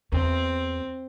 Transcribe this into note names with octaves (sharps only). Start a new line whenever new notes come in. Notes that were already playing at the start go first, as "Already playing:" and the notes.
E2 C4